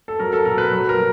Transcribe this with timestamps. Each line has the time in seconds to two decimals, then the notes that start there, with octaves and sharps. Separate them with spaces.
0.08 A4
0.19 F#3 A#4
0.33 A4
0.45 B2 A#4
0.58 B4
0.72 F#3
0.89 A#4
0.97 F#3